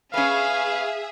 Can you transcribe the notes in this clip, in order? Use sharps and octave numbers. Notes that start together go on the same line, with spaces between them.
C#4 G#4 B4 E5 F5